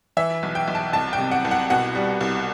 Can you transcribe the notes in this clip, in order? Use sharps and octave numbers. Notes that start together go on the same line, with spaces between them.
E3 E5
B1
G5
B1
A5
C2 A5
G5
C3
F#5
C2
F#5
B2 F#5
G3
C2